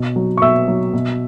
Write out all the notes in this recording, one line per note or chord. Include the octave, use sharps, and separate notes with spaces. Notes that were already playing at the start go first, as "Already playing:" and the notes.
Already playing: B2 C#5
F#3
C#6
B2 E5 E6
F#3
B2